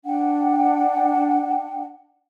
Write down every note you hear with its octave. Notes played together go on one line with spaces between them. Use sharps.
D4 F#5 G5